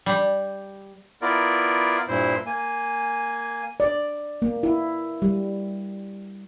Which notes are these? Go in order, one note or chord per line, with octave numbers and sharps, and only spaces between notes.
G3
B3 E4 F4 A#4 D5
G2 A#2 E4 C5
A#3 G#5
D5
A#3
E4
G3